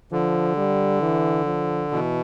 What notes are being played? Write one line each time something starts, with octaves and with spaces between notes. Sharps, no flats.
D3 F3
G3
E3
F3
B2 E3